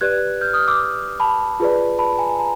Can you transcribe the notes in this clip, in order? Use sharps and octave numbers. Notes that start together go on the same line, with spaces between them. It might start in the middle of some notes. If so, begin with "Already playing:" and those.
G4 B4 D5 F#6 G#6
F6 G6
D#6 F6
D6 E6
A5 B5
F4 G#4 B4 D5
A5 B5
G#5 A#5
G#5 A#5